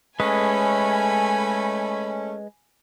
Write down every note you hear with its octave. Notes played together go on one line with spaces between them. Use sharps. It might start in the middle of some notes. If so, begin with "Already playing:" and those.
G#3 A3 C#4 B4 D#5 G#5 B5